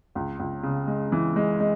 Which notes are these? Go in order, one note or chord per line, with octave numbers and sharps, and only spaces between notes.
C#2
C#2
C#3
G#3
E3
G#3
G#3